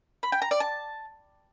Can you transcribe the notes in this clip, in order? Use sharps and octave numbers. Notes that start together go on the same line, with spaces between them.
B5
G5
A#5
D5
A5